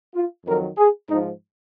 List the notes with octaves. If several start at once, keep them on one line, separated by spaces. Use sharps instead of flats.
F4
F2 D#3 F#3 A#4
G#4
G#2 F3 D#4